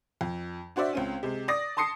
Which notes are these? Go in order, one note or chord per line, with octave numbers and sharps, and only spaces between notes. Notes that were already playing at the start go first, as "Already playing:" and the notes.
F2
D4 F#4 C5 D5 E5
C#2 C4 C#4
C3 G#3
D5 D#6 A#6
A5 C6 D#6 C7 C#7